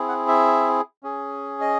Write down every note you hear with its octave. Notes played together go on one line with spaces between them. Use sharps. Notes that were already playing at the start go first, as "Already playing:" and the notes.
Already playing: C4 E4 G#4
F#5
E5
C#4 G#4
D#5